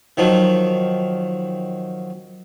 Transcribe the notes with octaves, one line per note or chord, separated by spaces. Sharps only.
D#3 F3 F#3